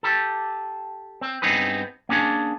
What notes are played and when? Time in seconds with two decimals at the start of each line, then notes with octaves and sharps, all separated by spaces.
0.03 G4 A4
1.21 C4
1.42 G2 B3 C4 D#4 G#4 B4
2.09 A#3 C#4 D4 G#4